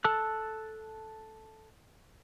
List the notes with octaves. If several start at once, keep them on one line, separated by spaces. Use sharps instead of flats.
A4 A5 E6 F#6